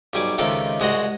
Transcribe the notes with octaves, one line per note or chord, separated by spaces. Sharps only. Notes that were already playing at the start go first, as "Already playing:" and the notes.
B1 G3 G#5 D6
C#2 C3 D#3 A4 G5 A5
C2 G#3 F#4 D#5 C6